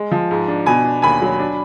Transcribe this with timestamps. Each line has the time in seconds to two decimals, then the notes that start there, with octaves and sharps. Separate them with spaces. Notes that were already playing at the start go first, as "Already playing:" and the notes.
Already playing: G#3
0.12 F3
0.31 G#2
0.48 D4
0.66 B2 G#5 B5
0.84 D4
1.02 D#2 G#5 B5
1.22 F#3
1.39 D4